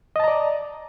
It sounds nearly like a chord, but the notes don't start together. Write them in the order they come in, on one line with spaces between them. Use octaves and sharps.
D#5 A5 A#5 D5